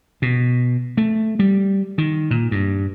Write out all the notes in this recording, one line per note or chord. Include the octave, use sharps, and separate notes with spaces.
B2
A3
G3
D#3
A#2
G2